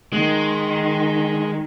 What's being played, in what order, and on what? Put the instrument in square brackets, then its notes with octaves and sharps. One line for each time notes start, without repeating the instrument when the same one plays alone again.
[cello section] D#3 [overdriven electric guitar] G#3